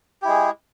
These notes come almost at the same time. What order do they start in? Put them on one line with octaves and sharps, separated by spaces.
G4 E4 G#3 G#4